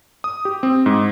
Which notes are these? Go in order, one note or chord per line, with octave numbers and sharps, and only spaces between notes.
D#6
G4
C4
G#2